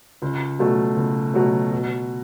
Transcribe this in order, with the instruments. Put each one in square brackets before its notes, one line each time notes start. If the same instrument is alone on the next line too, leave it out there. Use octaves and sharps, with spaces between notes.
[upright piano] C#2
B2 F#3 A3
C#2
B2 F#3 A3
B2